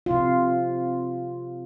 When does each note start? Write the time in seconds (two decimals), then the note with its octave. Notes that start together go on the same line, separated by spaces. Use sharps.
0.06 C3 F4